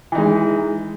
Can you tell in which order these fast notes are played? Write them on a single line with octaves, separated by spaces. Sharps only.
E3 D#4 G#3